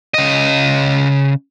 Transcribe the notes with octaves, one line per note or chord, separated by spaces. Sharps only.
C#3 D#5